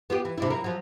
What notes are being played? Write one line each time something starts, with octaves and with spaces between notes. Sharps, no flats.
B3 F4 G4
E3
C3 D4 E4
F#3 A#3 E4
F3 F#3